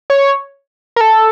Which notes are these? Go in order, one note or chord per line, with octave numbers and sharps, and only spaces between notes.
C#5
A#4
A4